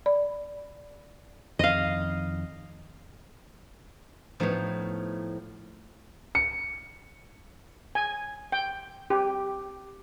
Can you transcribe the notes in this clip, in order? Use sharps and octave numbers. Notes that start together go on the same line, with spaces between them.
D5 B5
F2 D#3 D#5 F5
A2 F3 B3 D#4 C#5
C#7
G#5
G5
G4